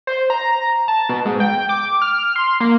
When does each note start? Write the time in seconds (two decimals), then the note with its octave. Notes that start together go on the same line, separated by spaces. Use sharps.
0.07 C5
0.30 A#5
0.88 A5
1.09 B2
1.25 G#2
1.40 G5
1.69 D6
2.02 F6
2.36 C6
2.60 A#3